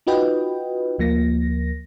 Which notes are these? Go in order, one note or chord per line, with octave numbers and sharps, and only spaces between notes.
D#4 F4 F#4 B4 D#5 G5
D2 F3 A#3 A#6